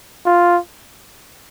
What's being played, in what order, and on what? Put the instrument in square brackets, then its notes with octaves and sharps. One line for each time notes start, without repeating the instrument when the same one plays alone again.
[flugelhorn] F4